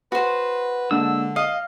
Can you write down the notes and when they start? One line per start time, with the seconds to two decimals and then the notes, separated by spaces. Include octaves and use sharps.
0.12 F#4 B4 C5
0.91 D3 G#3 A#3 D4 E6
1.36 D#5 F5 F6